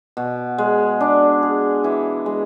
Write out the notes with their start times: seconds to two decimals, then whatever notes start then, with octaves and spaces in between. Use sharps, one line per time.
0.17 B2
0.58 G#3
1.01 D4
1.43 G#4
1.84 E3
2.26 G#3